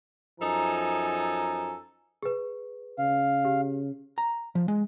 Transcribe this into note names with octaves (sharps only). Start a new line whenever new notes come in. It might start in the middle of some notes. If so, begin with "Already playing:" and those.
F#2 F3 D#4 A4 G#5 A#5
G#4 B4
C#3 F5
G4
A#5
F3
G#3